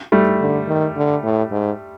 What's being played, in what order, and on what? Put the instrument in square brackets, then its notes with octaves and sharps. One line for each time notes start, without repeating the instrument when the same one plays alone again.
[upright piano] G3 A3
[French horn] D3
D#3
D3
A2
G#2